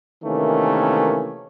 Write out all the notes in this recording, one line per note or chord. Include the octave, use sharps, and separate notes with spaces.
C3 D#3 E3 A3 A#3 C#4